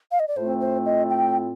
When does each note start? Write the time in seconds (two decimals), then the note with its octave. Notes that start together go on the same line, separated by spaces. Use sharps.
0.11 F5
0.20 D#5
0.28 D5
0.36 A2 A3 C4 F4 C5
0.61 C5
0.86 D#5
1.10 G5